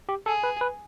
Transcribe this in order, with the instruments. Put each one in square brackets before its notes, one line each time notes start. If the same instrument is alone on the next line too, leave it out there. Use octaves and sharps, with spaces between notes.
[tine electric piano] G4
[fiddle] G#4 [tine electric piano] A4
[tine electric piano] B4
B4